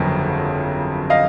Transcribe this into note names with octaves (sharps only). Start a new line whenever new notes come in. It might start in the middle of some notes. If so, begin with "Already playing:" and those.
Already playing: G1 F2 C#3 F#3 A#3
D#5 F5